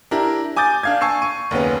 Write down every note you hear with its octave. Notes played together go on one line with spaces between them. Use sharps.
D4 E4 G4 A#4
G#5 D6 D#6 G6 A6
D4 F5 G#6
G#5 A5 C#6 E6 C7
C#6 D#7
F#1 D#2 B3 C#4